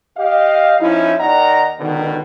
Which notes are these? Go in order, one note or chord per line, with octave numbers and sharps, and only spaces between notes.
G4 D#5 F5
F3 C#4 D#4 E4
D#2 D#3 D5 D#5 F#5 A#5
C#2 B2 D3 D#3